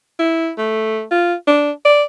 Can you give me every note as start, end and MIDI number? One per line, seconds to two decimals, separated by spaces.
0.19 0.51 64
0.58 1.04 57
1.11 1.34 65
1.47 1.71 62
1.86 2.03 74